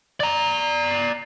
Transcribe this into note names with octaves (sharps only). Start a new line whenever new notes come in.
D5 A#5